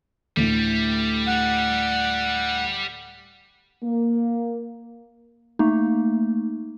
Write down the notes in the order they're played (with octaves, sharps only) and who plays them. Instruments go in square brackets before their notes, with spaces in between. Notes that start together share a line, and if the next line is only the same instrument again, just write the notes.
[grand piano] D2 A2 [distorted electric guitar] G3
[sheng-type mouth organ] F#5
[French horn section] A#3
[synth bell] A3 A#3 D#4